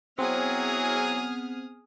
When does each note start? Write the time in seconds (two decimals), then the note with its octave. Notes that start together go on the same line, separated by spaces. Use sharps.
0.19 F#3 B3 C4 E4 G#4 D#6 F6